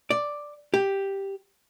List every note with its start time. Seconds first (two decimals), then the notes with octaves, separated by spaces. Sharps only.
0.10 D5
0.74 G4